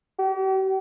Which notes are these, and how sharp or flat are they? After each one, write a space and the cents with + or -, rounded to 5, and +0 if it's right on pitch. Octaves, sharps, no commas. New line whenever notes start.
G4 -45